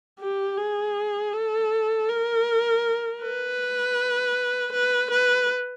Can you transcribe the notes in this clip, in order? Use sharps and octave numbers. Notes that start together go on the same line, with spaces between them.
G4
G#4
A4
A#4
B4
B4
B4